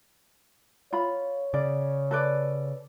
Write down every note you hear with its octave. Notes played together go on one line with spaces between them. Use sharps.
F4 C#5 B5
C#3 D5
A4 B4 D5